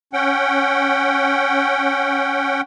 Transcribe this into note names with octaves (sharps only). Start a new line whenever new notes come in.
C#4 F#5 G5